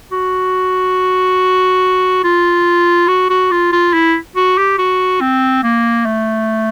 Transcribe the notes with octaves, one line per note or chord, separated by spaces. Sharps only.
F#4
F4
F#4
F#4
F4
F4
E4
F#4
G4
F#4
C4
A#3
A3